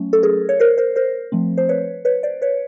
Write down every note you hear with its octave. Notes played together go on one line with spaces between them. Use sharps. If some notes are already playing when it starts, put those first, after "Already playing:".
Already playing: F#3 A3 C#4
A4
G#4 A#4
C#5
A#4 C5
A#4 C5
A#4 C5
F3 A3 C4
C5
B4 C#5
B4 C#5
C5 D5
B4 C#5